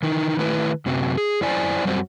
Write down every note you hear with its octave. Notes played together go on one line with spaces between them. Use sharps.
D#3 E3 D#4
D#3 A3 E4 B4
F#2 C3 F#3
G#4
F#2 E4 C5 D5 G#5
F#2 G3 C4 F#4